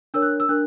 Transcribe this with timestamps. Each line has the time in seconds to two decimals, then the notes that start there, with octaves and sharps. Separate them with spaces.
0.14 D4 A#4 C#5 E6
0.22 F#6
0.40 E6
0.49 D4 A#4 F#6